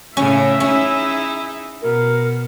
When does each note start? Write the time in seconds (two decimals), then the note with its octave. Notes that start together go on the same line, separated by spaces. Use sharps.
0.17 A2 C#3 C#4 E5
0.60 C#4 D#4 E4 G#4
1.82 B2 A#4